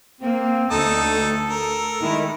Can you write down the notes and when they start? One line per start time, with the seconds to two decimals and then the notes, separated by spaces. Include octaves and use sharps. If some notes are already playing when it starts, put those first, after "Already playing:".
0.21 A#3 C4
0.71 D2 D#4 A4 A5 D#6
1.50 A#4
2.01 D#3 G#3 E4